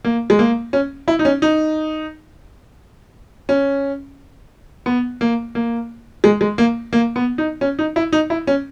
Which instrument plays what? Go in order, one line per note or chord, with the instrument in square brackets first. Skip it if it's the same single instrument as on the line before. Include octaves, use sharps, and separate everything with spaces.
[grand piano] A#3
G#3
A#3
C#4
E4
D#4
C#4
D#4
C#4
B3
A#3
A#3
G#3
G#3
A#3
A#3
B3
D#4
C#4
D#4
E4
D#4
E4
C#4